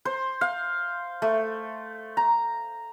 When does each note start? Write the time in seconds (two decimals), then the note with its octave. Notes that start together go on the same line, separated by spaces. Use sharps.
0.05 C5
0.41 F5
1.22 A3
2.17 A#5